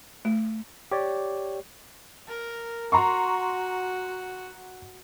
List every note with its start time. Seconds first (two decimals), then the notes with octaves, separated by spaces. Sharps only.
0.25 A3
0.91 G4 C#5 D5
2.28 A#4
2.92 F#4 A#5 C6 C#6